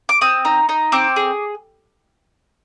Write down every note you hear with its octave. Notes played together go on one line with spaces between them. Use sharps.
D6
C4 D#6
D#4
D#4
C4 D6
G#4